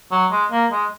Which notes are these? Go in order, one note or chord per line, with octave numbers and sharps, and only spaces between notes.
F#3
G#3
A#3
G#3